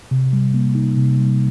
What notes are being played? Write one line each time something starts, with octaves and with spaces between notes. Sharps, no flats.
C3
G3
A#3
D#4
C3
G3